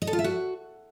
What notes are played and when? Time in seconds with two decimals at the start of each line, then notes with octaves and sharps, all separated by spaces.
0.02 D#5
0.07 A4
0.13 F4
0.19 E5
0.24 F#4